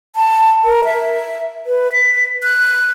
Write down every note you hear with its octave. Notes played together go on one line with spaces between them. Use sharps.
A5
A#4
E5
B4
B6
F#6